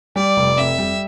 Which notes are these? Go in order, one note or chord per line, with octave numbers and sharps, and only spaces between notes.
G3 D5
F1
F2 E5
G3